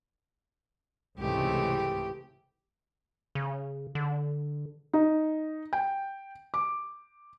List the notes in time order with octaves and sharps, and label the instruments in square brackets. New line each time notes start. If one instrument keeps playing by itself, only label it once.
[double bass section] C#2 G#2 C3 [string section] E3 G#3 A3 [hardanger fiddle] G4
[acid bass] C#3
D3
[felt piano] D#4
G5
D6